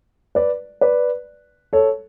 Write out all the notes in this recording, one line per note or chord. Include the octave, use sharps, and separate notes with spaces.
B4 D5
B4 D5
A4 C#5